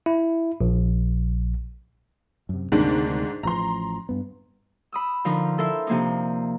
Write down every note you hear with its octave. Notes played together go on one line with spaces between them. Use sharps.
E4
A#1
F#2 C3
D2 G#2 C3 D#3 A#3 D4
A1 F3 A#5 C6
G2 B3
B5 D#6 E6
D3 F3 D#4 A#4
E4 A4 A#4 C5 E5
C3 F3 A#3 D4 D#4